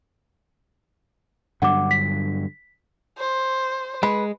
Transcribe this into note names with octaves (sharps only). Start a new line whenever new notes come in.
G2 D3 F#3 F#5 D6
B6
C5
G#3 B4